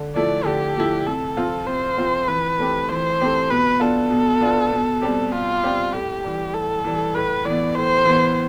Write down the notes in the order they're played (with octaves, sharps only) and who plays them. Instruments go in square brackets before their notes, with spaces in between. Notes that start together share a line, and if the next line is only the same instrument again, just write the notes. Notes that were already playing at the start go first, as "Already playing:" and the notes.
Already playing: [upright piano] D3
[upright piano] F3 A3 E4 [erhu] D5
[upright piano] D3 [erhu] G4
[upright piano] F3 A3 E4
[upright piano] C3 [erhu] A4
[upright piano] F3 C4 F4
[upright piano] C3 [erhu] C5
[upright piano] F3 C4 F4
[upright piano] E3 [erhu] B4
[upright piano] A3 C4 G4
[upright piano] E3 [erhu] C5
[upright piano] A3 C4 G4
[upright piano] B2 [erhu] B4
[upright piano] B3 D4 F4 [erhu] A4
[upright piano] B2
B3 D4 F4
B2
G3 C4 G4
[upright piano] B2 [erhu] F4
[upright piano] G3 C4 G4
[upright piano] A2 [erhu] G4
[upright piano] E3 G3
[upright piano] A2 [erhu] A4
[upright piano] E3 G3
[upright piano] A2 [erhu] B4
[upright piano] E3 B3 [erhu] D5
[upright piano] A2 [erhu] C5
[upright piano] E3 B3